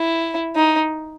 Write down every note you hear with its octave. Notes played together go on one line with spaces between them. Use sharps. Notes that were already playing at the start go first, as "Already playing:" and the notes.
Already playing: E4
D#4